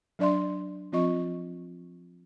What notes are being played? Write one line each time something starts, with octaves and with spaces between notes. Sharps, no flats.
F#3 D4 D5 E5 C6
F3 C4 F4 D#5 C#6